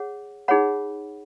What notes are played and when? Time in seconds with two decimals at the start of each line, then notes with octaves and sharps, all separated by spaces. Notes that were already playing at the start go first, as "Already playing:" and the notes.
Already playing: G#4 C#5 F#5
0.48 D#4 G#4 C#5 F#5 B5